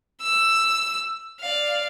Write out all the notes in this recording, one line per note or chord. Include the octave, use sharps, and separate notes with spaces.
E6
D5 F5